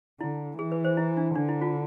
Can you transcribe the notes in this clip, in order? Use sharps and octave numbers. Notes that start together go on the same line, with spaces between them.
D3 E4
E3 G#4
B4
C5
E4
D4
D3 D4
E4
F4